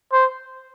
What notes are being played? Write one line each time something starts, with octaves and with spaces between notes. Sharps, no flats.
C5